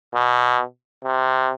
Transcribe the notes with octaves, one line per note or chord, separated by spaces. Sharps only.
B2
C3